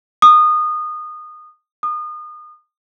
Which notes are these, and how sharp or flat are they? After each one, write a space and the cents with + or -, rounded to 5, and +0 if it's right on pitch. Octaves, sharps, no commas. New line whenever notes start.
D#6 -20
D#6 -30